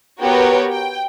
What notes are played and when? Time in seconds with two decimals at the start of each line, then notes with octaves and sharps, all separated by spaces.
0.20 B3 F#4 G4 A#4 B4 C#5
0.71 G5